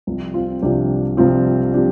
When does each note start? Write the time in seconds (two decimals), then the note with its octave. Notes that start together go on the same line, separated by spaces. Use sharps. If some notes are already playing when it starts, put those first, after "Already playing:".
0.07 C2 C3 F3
0.34 C4 F4
0.62 C2 C3 F3 D4 G4
1.17 C2 C3 F3 C4 F4
1.74 C3 F3 D4 G4